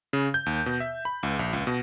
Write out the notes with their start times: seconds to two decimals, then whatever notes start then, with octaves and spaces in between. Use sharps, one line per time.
0.13 C#3
0.34 G6
0.46 D#2
0.66 B2
0.80 E5
1.05 B5
1.23 C#2
1.39 A#1
1.53 C#2
1.67 B2